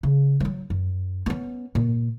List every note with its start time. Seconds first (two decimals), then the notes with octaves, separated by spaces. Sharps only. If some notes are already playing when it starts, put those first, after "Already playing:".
0.03 C#3
0.40 F3 F#3
0.70 F#2
1.26 B3 C#4
1.75 A#2